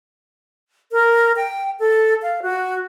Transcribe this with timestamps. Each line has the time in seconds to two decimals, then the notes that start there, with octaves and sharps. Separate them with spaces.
0.92 A#4
1.36 G5
1.79 A4
2.22 F5
2.42 F#4